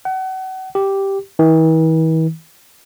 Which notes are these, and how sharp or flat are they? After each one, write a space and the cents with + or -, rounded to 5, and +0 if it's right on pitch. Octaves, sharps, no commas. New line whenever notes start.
F#5 +35
G4 -5
E3 -45